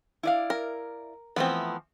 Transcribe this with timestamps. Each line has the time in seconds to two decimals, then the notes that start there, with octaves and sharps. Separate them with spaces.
0.23 E4 D5 F5
0.50 A#4
1.36 E3 F3 A3 B3 C4